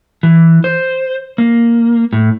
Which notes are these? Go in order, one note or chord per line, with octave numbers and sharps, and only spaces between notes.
E3
C5
A#3
A2